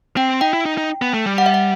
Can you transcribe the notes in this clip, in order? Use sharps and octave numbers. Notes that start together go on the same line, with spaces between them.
C4 G5
D#4 G5
E4
D#4
D#4
B3
A3
G3
F#5
E5
F#5